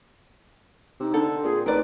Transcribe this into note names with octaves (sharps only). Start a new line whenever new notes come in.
C3 D#4
D3 A4
C4
A#2 G#4
A1 D#4 A#4 B4 D5